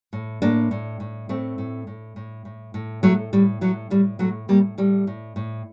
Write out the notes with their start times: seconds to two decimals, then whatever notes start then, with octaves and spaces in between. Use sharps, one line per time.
0.13 A2
0.42 A2 A#3 D4
0.71 A2
1.00 A2
1.29 A2 A3 C4
1.58 A2
1.87 A2
2.16 A2
2.45 A2
2.74 A2
3.03 A2 F#3 A3
3.33 A2 G3
3.61 A2 F#3
3.90 A2 G3
4.19 A2 F#3 A3
4.48 A2 G3 A#3
4.78 A2 G3
5.07 A2
5.36 A2